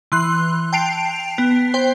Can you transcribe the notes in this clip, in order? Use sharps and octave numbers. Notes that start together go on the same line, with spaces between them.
E3 C6 F#6
G5 A5 C7 D7 F7
B3
C5 G5